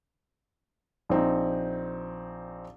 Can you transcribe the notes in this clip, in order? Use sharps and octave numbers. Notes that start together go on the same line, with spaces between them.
A#1 C4 D#4